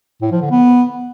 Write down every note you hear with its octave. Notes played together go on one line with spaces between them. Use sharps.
A2
F3
D3
B3